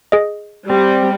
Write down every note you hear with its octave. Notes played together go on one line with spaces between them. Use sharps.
G#4 D#5
G3 C4